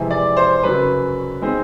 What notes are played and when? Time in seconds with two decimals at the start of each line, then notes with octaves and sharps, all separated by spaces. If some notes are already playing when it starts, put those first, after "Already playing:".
Already playing: F2 C3 E3 G#3
0.11 D5
0.37 C5
0.63 F#2 C#3 F#3 B4
1.42 D#3 G#3 C4